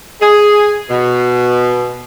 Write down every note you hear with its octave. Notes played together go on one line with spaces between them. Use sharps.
G#4
B2